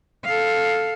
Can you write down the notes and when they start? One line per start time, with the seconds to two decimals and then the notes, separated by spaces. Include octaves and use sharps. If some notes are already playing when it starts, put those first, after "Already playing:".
0.24 A4 F5